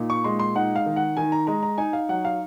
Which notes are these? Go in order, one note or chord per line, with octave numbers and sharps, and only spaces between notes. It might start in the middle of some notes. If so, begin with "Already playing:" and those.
Already playing: A#2 D#4
C#6
G#3 C6
C6
D#4 F#5
F5
D#3
F#5
D#3 G#5
A#5
G#3 A#5
A#5
D#4 G#5
F5
F#3 F#5
F5